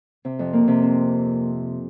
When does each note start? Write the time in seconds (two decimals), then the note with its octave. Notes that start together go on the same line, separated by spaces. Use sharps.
0.25 C3
0.39 F2
0.53 A#3
0.68 C3
0.82 C4